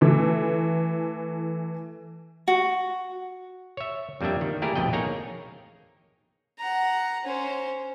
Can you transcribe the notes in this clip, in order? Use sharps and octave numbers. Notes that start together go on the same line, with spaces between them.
E3 A3
F#4
C#5 E5
F2 G3 A#3 D4 E5
D#3
A3 A#3 E4 G4 G#4 A#4
A#1 F2 B2 D#5 G5
A#3 D#4 G#4 C#5 G#5 A#5
F#5 A#5
C#4 C5